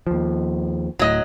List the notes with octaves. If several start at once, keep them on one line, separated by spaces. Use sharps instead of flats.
D#2 F3
D1 A2 F#3 D#5